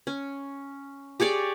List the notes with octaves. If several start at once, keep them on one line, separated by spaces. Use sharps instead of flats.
C#4
G4 G#4 C#5 D5